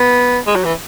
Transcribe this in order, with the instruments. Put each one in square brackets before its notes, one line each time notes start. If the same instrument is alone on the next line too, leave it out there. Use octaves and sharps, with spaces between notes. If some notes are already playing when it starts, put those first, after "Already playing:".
Already playing: [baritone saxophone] B3
G#3
F#3
E3